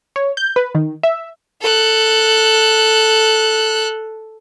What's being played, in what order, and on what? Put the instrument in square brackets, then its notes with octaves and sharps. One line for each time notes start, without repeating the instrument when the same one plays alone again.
[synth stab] C#5
G6
B4
D#3
E5
[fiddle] A4 F#6